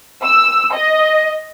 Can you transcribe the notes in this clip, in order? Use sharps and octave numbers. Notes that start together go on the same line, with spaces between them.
E6
D#5